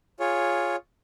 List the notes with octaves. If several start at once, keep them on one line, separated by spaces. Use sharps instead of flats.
F4 G#4 C#5